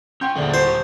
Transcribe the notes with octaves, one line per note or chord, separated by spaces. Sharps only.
C#4 G5 C6 G6
D#1 A#1 D3 A3 G#4 D5
D#1 E4 G4 C5